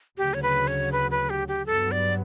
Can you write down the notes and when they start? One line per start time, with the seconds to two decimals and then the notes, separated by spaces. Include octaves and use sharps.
0.18 D2 C#3 F#3 G4
0.34 C#5
0.43 B4
0.67 C#5
0.92 B4
1.11 B4
1.30 G4
1.48 G4
1.66 G2 F#3 B3 A4
1.92 D5